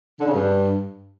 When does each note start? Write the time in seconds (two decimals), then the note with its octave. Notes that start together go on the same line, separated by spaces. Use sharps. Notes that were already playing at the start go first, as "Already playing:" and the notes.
0.20 D3
0.27 C#3
0.34 G2